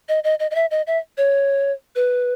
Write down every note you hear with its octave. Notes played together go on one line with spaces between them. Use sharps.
D#5
D#5
D#5
D#5
E5
D#5
E5
C#5
B4